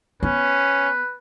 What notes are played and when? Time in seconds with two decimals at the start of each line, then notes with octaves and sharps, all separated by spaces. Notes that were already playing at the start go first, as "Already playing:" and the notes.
0.23 B3 C#4 B4